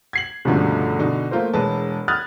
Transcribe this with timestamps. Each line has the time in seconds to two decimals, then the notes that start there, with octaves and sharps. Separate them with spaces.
0.13 G#6 C7 F#7
0.45 C#2 G2 B2 D3 F3 A3
0.99 B2 D3 D#4
1.31 A3 A#3 F4 A#4 C5
1.53 E1 G#3 B4 A5
2.08 B5 D#6 F6 F#6 G#6 A6